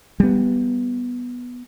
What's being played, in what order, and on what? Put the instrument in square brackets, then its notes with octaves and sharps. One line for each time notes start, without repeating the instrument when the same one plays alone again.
[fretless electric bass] G3 B3